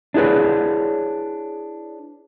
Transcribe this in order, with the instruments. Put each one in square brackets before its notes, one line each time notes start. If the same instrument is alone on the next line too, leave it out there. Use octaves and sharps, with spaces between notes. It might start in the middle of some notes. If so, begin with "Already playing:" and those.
[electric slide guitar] D4 E4 G#4 B4 C#5